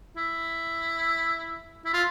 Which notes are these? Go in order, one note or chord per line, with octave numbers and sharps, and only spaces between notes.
E4
E4
F4